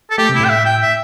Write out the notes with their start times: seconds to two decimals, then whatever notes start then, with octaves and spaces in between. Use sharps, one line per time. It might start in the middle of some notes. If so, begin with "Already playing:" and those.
0.11 A4
0.18 A3 G4
0.29 C3
0.35 A2 E4
0.45 G5
0.50 E5
0.66 G5
0.82 E5